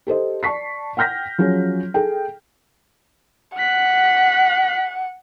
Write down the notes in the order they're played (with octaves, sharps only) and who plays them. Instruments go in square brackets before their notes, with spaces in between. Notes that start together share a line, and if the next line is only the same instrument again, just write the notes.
[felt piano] G4 A4 C5 D#5
D5 A5 C#6 B6 C7
F#5 G5 F6 G6 A#6 B6
F3 F#3 C#4 G#4
G#4 A4 G5
[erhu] F#5 [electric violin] F#6 B6